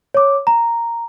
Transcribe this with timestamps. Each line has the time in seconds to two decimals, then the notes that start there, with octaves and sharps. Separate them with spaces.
0.14 C#5 D6
0.47 A#5